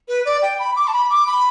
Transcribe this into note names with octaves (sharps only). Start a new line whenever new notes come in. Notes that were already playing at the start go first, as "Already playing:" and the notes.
B4
D5
G5
B5
D6
A5
B5
D6
B5